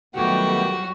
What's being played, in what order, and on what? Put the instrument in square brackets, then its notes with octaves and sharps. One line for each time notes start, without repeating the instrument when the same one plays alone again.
[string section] F2 F#3 G3 [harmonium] D#3 A3 B3 [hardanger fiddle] F#4 [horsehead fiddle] G4